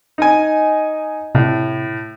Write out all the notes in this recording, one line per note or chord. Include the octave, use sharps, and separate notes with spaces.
D#4 D#5 G#5
A2 C3